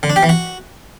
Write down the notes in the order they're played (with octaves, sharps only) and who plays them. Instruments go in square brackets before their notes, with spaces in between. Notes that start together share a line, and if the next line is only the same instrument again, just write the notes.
[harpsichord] D3
D4
G4
E3
F#4